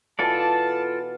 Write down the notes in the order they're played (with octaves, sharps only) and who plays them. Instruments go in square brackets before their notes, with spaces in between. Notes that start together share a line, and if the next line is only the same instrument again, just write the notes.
[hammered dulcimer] B2 E3 [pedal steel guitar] F4 A4 D5 [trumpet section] A5